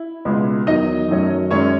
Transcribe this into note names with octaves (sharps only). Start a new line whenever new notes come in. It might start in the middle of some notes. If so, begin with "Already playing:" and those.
Already playing: E4
C#2 B2 G#3 B3
E2 D#3 F#3 D#4 D#5
F#2 D#3 F#3 A3 C#4
F#2 D#3 G#3 C#4 C#5